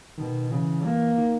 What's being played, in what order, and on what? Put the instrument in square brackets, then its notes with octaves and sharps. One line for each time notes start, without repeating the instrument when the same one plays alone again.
[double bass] B2 [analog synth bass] D#3
[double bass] C#3 [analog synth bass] E3
[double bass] A#3
[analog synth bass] D#3